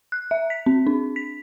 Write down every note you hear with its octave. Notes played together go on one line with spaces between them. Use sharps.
F#6
E5
B6
C4
D4
B6